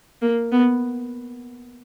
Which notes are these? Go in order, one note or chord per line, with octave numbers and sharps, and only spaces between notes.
A#3
B3